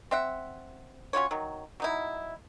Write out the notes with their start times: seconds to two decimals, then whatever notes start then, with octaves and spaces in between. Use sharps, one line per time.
0.11 C4 E5 F#5
1.13 C#4 F4 F#4 C#5
1.31 D#3 F#3
1.80 F#3 D#4 E4